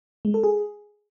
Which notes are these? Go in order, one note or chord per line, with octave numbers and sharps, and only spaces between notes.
G#3
A4
G#4